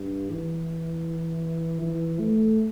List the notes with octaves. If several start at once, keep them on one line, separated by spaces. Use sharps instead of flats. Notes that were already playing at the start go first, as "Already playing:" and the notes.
Already playing: G2
E3
E3
A3